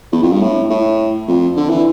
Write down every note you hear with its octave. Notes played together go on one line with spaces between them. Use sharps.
E2
F2
G2
A2
A2
F2
D3
E3